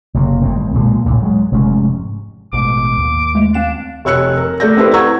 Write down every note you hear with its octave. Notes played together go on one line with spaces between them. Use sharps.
F#1 C3 F#3 A#3
G1 A2 D#3 C4
B1 A#2 G#3
A1 D2 A2
F#3 G#3
F1 G#2 C3 C#4
A1 G#2 B2 D6
D#2
G#3 A3
C4 D4 F5 E7
F1 C#5 E6 F#6 C#7
A#4
A3 D5 G6 A#6
C4 E4 G4 A4 B4 C5
F#5 A#5 C#6 E6 G#6